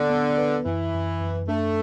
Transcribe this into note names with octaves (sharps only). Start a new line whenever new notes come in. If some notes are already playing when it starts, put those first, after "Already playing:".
Already playing: D3 B3
B3
B4
F#2 E3
F#2
F#2
A3 D4